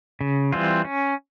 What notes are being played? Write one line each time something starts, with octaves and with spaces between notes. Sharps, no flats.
C#3
E3 G3 C4 F4
C#4